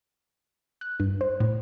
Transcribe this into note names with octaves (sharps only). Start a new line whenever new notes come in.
F#6
G2
C5
A2